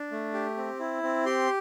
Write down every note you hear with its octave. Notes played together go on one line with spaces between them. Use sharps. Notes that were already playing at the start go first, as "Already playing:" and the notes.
Already playing: D4
A3
G4
C4
E4
C4
G4 C6